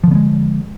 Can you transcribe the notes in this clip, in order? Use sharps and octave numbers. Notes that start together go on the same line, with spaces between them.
D3 F3 G#3 B3